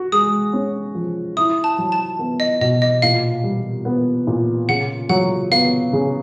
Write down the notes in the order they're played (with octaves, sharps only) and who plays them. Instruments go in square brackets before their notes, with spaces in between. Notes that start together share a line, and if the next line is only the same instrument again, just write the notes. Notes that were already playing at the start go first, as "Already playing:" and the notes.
Already playing: [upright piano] F#4
[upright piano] G#3 [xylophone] D#6
[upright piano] C#4
F3
[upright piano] E4 [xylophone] D#6
[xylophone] A5
[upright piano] F#3
[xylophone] A5
[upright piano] B3
[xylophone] D#5
[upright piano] B2 [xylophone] D#5
[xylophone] D#5
[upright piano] A#2 [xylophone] F5
[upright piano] G3
B3
A#2
[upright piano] C#3 [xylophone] F#5
[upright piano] F#3 [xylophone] F#5
[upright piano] B3 [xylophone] F5
[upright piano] C#3